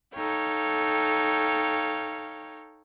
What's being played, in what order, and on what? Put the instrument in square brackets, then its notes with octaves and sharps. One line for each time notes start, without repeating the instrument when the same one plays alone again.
[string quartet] D#4 A4 C#5 F5 G5